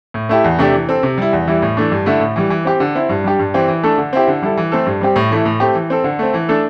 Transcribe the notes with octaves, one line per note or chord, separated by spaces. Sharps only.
A2
A3 E4 G4
E2
C3 A3 D4 G4
E3
C4 A4
C3
G3 E4
E2
E3 G3 E4
A2
E3 A3 D4
G2
D3 A3 E4
A2
E3 G3
E3
C4 G4
D3
C4 E4
G2
G3 D4 G4
G2
E3 C4 G4
E3
A3 D4 A4
D3
C4 E4 G4
D3
G3 E4 A4
E3
A3 C4 A4
G2
G3 C4 G4
A2
E3 A3 E4
A2
A3 C4 G4
E3
C4 A4
D3
A3 C4
E3
A3 D4 A4